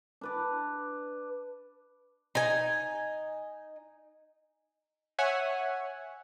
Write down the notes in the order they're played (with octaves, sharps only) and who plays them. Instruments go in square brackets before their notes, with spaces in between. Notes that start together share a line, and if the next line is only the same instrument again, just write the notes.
[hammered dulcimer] D4 B4 D5
[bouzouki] D#4 G#5
[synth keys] C#5 E5 F#5 G#5